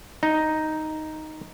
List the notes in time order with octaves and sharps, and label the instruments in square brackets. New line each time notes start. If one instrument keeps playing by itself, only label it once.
[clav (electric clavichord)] D#4